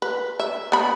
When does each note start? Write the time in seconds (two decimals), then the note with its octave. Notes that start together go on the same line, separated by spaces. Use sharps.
0.02 B4
0.40 E5
0.72 B3 B5